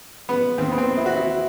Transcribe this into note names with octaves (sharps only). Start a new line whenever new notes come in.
B3
D#2 D#3 C4
B3
C4
E4
F#4
E4